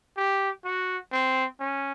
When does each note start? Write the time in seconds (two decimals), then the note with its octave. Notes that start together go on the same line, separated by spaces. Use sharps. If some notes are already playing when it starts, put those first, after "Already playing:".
0.17 G4
0.64 F#4
1.12 C4
1.60 C#4